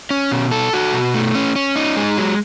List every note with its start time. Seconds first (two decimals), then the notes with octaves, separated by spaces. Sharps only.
0.10 C#4
0.32 B2
0.51 A4
0.73 F#4
0.94 B2
1.14 A3
1.35 C#4
1.56 C#4
1.76 D#4
1.97 G#3
2.17 F#3